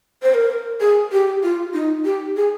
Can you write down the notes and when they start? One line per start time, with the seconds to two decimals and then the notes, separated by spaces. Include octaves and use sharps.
0.22 C5
0.34 A#4
0.81 G#4
1.12 G4
1.43 F4
1.74 D#4
2.05 G4
2.36 G#4